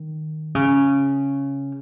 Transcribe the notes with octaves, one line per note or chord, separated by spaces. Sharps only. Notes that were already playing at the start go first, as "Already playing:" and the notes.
Already playing: D#3
C#3